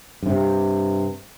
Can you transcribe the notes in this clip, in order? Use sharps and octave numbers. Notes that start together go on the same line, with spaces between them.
G2 C3